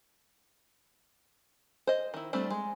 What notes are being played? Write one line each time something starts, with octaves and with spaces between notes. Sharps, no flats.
C5 D#5
D#3 E4
G3 A3 C4 D4
G#3